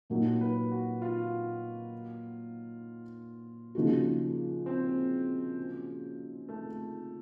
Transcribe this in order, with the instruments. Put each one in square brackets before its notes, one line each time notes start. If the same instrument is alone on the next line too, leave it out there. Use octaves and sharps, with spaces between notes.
[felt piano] A#2 F#3 A#3 D#4
[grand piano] B4
F#4
F4
[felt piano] C#3 F3 A#3 D#4 F#4
[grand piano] C4
A3